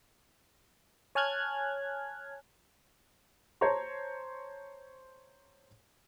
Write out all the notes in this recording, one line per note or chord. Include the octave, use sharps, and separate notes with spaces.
C#5 G#5 A5 F6 F#6 G#6
C5 C#5 A5 A#5 C#6